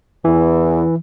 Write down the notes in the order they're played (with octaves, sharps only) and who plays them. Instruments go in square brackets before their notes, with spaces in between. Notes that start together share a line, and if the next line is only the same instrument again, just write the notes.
[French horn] E2 [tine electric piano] E3